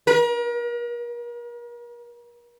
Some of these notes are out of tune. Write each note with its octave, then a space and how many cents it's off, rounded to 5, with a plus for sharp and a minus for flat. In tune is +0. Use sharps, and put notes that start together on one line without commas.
A#4 +40